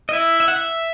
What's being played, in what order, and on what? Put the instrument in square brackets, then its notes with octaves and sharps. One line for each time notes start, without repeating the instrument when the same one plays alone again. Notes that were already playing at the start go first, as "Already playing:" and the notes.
[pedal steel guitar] D#5
[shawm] E4 [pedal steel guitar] E5
[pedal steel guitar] E5
F#5
E5